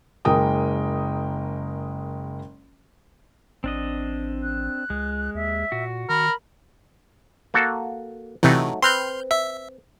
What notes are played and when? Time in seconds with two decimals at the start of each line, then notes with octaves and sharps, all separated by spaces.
0.25 F#1 G#3 A#4 G5 D#6
3.64 A1 C4 D4 D#5
4.43 F#6
4.90 C#2 G#3
5.35 D#2 E5
5.72 A#2 F#4
6.09 D#3 A#4 B5
7.54 A#3 F#4 A4
8.43 C3 E3 F#3 A3 D#4
8.82 C4 B4 C6 F6 G6
9.31 E5